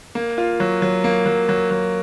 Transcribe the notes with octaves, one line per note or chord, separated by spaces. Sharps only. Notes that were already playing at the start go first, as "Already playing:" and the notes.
A#3
F4
F#3
F#3
A#3
F#3
F#3
F#3